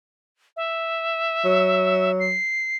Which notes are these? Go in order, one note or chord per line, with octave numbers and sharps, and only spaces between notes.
E5
F#3
C7